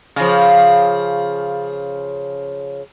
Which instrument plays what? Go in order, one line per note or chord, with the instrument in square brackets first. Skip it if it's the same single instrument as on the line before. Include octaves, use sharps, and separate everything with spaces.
[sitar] C#3 F3